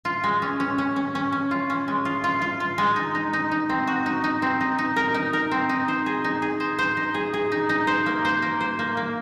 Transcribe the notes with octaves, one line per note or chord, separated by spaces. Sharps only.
F4
G#3
C#4
C#4
C#4
C#4
C#4
C#4
F4
C#4
G#3
F4
F4
F4
F4
G#3
D#4
D#4
D#4
D#4
C4
F#4
D#4
D#4
C4
D#4
D#4
A#4
D#4
A#4
C4
D#4
C5
G#4
D#4
G#4
C5
C5
D#4
G#4
G#4
D#4
D#4
C5
A#3
C5
A#3
C5
A#3
A#3